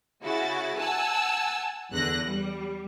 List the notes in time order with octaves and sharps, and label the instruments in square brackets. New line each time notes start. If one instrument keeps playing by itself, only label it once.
[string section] C#3 E4 F#4 A6
F#5 G#5 A5 E6
E2 D3 F#6 A#6
G3